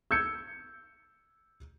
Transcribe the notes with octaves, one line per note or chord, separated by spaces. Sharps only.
E6 G6 G#6 C#7